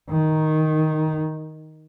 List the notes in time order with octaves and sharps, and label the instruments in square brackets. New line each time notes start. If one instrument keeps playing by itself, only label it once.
[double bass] D#3